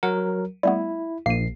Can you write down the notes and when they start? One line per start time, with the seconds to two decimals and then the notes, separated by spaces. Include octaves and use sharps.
0.03 F#3 A#4 F#5
0.63 G3 A3 B3 E4
1.26 A#1 A#3 C7 D#7